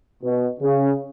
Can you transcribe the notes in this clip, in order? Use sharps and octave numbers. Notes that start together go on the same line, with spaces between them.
B2
C#3